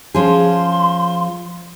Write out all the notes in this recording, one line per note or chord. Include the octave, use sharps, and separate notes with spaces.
F3 C#4 G#4 C6